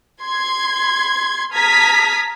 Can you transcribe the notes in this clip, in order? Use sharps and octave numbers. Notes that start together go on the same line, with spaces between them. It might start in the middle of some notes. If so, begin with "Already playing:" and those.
C6 G#6
A5 A#5 D#6 F6 G#6 B6